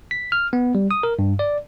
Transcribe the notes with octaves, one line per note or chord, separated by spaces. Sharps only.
B6
F6
B3
G3
D#6
A#4
G2
D5